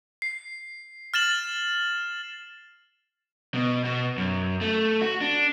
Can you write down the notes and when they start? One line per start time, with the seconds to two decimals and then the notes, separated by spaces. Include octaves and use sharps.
0.22 C7
1.14 F6 A6 E7 F#7
3.54 B2
3.84 B2
4.17 F#2
4.61 A3
5.01 F#4
5.21 D4